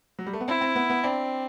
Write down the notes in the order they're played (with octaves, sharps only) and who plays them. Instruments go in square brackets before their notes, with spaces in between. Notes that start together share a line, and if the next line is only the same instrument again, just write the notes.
[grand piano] F#3
G3
A3
B3
[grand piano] C4 [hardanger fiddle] E4
[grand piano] C4
B3
B3
[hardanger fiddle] C4 [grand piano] D4